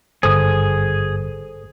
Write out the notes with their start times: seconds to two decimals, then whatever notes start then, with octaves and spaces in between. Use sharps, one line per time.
0.23 G#1 G2 D3 G#4 A4 C5 D#6